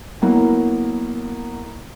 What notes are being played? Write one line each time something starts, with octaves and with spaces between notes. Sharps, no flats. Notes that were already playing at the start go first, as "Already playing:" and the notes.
F#3 A#3 B3 E4